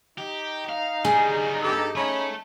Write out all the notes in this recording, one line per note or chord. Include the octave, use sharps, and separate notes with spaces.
D#4 G4
F5
G3 B3 G#4
G2 G4 A4
A3 C#4 C#5 B5